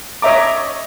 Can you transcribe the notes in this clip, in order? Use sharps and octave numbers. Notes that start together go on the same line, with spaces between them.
C#5 D#5 E5 A#5 D6